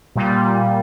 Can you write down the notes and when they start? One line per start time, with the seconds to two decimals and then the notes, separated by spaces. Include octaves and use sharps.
0.16 A#2 G3